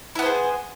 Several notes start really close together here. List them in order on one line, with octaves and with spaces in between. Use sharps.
E4 B3 C5 G#4